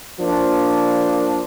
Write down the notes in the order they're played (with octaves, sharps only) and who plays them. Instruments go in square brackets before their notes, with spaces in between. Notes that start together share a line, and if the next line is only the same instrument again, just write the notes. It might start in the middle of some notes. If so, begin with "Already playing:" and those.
[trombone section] F3 A#3 D4